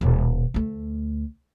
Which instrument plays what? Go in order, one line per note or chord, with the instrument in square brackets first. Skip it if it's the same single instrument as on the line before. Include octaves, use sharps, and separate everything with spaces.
[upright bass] D#1 B2
D2 A3